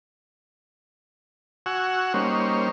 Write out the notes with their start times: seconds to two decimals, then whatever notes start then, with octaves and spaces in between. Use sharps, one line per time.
1.66 F#4 F#5 G#5 C#6 E6
2.14 G3 A#3 C#4 D#4 C5 C#5